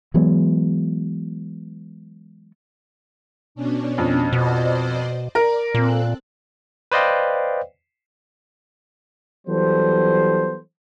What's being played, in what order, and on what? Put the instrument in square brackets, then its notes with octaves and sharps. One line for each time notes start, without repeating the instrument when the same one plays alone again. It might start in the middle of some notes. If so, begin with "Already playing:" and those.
[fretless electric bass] E3 F#3 G#3 B3
[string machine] B2 C#4 D4
[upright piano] F2
[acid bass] B2 [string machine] C5 D5 D#5
[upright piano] A#4 [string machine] D5
[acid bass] A#2 [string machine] C4 A4 F#6
[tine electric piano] B4 C5 D5 D#5 F5 G5
[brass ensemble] E3 F#3 G3 B3 A4 C5